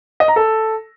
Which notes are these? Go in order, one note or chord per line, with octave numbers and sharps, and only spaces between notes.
D#5
A#5
A4